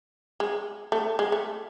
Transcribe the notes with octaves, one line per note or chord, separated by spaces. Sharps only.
G#3
A3
G#3
A3